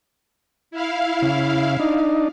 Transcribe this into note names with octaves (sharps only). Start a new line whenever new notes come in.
E4 F5
C#3
D4 D#4